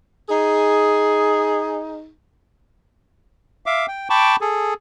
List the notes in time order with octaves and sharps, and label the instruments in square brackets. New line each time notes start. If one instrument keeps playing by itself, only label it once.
[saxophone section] D#4 G#4
[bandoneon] E5 F5 D6
G5
G5 A5 B5 C#6 D6
G#4 A4